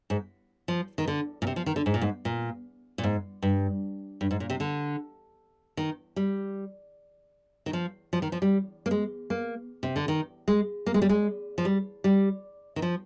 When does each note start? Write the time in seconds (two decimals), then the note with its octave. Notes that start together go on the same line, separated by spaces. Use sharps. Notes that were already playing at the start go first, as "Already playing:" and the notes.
0.10 G#2
0.68 F3
0.98 D#3
1.08 D3
1.42 A#2
1.47 C3
1.56 F3
1.66 D#3
1.76 D3
1.86 G#2
1.94 A#2
2.02 G#2
2.25 A#2
2.98 A#2
3.04 G#2
3.42 G2
4.21 G2
4.31 G#2
4.40 A#2
4.50 C3
4.60 D3
5.77 D#3
6.16 G3
7.66 D#3
7.73 F3
8.13 F3
8.22 D#3
8.32 F3
8.42 G3
8.86 A#3
8.91 G#3
9.30 A#3
9.83 C3
9.96 D3
10.08 D#3
10.48 G#3
10.86 A#3
10.94 G#3
11.02 G3
11.09 G#3
11.58 F3
11.65 G3
12.04 G3
12.76 D#3
12.82 F3